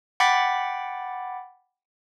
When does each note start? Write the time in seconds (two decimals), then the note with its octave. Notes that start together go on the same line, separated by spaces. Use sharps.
0.20 F#5 G5 B5 D6 A6 B6